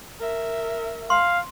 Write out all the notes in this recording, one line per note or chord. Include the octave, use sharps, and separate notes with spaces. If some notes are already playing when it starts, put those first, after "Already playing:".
A#4 E5
F5 C6